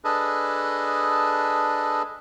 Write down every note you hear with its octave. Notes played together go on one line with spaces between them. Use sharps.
D4 G#4 A4 B4 D#5